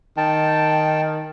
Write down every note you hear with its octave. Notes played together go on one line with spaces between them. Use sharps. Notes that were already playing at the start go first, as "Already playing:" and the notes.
D#3 G5 A5